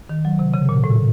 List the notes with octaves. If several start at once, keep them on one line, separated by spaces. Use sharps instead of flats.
D#3
F#3
C3
C#3
A#2
A2